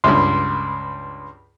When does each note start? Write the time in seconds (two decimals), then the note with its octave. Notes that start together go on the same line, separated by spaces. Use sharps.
0.04 C#2 G2 C6